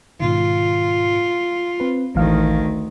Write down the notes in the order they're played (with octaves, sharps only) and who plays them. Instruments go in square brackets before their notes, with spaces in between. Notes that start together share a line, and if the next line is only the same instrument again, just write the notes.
[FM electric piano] G#2 B2 D#3 [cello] F4
[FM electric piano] C4 B4
[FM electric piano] A1 E3 F5 [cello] D2 D#3